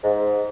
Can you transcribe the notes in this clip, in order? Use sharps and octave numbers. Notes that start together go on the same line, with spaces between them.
G#2